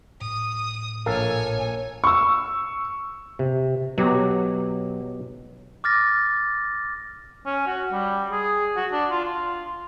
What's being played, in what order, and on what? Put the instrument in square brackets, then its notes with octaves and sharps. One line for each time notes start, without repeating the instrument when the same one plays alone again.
[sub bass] A2 [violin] D#6
[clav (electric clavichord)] A#1 A4 F5 [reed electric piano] A#4 [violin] C#5 G#5
[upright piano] C#6 E6
[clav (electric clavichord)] C3
[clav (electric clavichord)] B2 G4 A#5 [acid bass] F#3
[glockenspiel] D6 F6 A6 A#6
[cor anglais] C#4
F#4
G3
G#4
F#4
D4
F4
F4